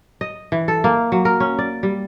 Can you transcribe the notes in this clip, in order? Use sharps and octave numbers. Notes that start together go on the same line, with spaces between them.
D#5
E3
A4
A#3
F#3
A#4
C#4
D5
G3